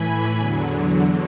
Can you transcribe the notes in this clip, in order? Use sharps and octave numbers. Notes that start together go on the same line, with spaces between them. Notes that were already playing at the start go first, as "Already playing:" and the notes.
Already playing: A2 E3 G#5 B5
E2 D3 F#3